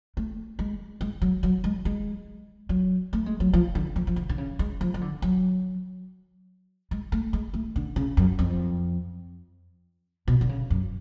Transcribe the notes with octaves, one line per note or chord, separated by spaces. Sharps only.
A3
G#3
G#3
F#3
F#3
G#3
G#3
F#3
A3
G#3
F#3
F3
D3
F3
F3
D3
D3
C#3
G#3
F3
F3
D3
F#3
G#3
A3
G#3
A3
D3
C#3
F#2
F2
B2
D3
C#3
F#2